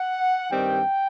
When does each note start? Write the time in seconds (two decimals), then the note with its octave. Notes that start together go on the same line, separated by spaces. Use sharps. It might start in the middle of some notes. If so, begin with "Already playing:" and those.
Already playing: F#5
0.51 G2 D#3 G3 C4 G5